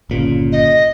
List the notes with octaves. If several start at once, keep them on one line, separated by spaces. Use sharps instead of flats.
G1 A#2 C#3
D#5